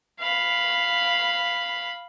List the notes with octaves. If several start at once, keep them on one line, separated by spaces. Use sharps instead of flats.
F5 B5